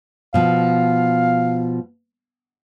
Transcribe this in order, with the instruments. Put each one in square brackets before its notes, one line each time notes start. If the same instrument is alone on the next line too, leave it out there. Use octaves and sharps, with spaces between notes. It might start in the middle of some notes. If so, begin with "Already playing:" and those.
[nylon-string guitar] B2 F3 [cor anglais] F5